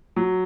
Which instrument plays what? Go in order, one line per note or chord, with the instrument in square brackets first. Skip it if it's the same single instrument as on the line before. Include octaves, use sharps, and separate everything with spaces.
[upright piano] F#3